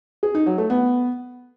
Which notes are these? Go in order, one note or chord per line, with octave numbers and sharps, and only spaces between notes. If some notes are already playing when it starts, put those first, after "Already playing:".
G#4
D#4
F#3
A3
B3